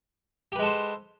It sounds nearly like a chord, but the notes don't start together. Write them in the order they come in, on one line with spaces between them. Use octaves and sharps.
G4 B4 G#3 A4 C5